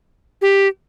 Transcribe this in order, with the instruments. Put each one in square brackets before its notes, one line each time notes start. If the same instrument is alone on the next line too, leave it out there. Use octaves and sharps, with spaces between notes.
[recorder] G4